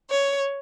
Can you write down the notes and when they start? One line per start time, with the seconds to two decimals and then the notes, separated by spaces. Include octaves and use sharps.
0.09 C#5